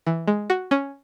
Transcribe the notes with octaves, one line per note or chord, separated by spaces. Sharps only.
E3
G#3
F#4
C#4